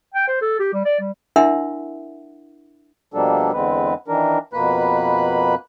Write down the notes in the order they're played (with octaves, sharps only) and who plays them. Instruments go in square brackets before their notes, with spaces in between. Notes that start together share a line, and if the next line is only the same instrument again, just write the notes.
[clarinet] G5
C5
A4
G4
G3
D5
G3
[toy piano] D4 E4 A#4 E5 F#5 C6
[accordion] B2 F3 G3 A#3 D4 A4
E2 D3 G#3 C4 B4
D#3 E3 D4 A#4
F2 B2 A#3 B4 B5 F#6